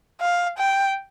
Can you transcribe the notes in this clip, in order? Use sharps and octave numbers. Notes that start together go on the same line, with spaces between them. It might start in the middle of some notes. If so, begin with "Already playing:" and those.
F5
G5